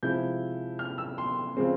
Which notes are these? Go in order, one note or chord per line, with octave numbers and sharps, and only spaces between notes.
C3 F3 G#3 E4 G6
F6
E6
C6
C#3 F3 G#3 C4